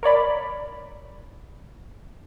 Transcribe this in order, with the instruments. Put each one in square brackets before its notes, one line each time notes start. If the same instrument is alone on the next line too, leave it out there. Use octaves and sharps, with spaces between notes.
[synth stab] A#4 C#5 D5 B5